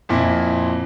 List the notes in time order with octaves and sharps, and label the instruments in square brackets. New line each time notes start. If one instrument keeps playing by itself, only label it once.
[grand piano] F2 A#2 E4